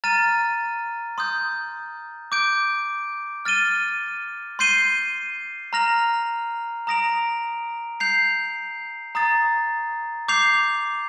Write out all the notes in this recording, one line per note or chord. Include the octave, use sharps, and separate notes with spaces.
A#5 F6 A6 D#7
C6 D#6 G6
D6 G6 D7
F6 A6 D#7 G7
C6 G6 C7 D#7 G7
A#5 F6 A#6 F7
A#5 D#6 A#6 D7 F7
G6 C7 F7
A#5 D#6 A6
D6 G6 C7 F7